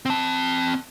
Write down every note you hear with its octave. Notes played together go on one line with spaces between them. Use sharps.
C4 A5